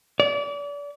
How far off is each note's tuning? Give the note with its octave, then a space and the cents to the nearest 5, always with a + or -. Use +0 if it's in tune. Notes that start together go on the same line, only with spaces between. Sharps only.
D5 -35